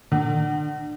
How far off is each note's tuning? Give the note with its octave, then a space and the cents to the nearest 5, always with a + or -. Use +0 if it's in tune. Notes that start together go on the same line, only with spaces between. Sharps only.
D3 +35